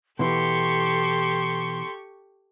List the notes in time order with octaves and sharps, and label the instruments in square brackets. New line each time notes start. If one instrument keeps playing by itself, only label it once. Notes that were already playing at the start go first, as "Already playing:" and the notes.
[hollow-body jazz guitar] B2 E3 [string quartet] G4 A4 C#6 [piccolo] C6